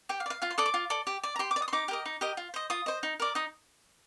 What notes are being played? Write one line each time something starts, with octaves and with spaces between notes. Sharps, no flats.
G4 G5
F5
D5
F5
F4 F5
C6
A4 D5 D#6
D6
F4
A4 D5
G4
D5
A#5
G4 C6
D6
D5
D#6
C6
D#4 D6
G4 A#4 D#5
D#4
G4 A#4 D#5
F4
C5 D#5
F4 D#6
C5 D#5
D#4
A#4 D5
D#4 D#6